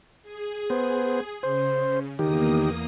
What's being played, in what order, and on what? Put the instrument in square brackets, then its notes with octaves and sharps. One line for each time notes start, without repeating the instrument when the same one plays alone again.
[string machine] G#4
[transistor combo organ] B3 C5
[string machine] C#3 [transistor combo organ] C5
[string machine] E2 A#3 D#6 [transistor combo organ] D#3 G4